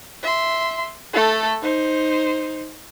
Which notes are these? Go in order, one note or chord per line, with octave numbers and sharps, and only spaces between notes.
E5 C6
A3 A4
D#4 C5